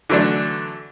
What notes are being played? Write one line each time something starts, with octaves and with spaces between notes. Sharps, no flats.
D3 E3 F#3 A3 D4